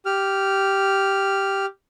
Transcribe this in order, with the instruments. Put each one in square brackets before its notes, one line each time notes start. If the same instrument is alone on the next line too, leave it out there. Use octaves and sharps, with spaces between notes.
[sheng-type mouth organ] G4 F6